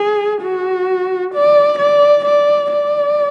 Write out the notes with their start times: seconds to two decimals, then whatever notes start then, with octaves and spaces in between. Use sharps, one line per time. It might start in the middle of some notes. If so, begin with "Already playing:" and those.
Already playing: G#4
0.42 F#4
1.35 D5
1.79 D5
2.26 D5
2.72 D5